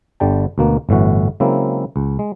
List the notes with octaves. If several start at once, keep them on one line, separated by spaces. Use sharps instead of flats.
G1 D3 G3 G5 A5
D2 B2 A#3
G1 A2 E3 F#4
C#3 F#3 G#3 A#3 C4 E4
C#2
G#3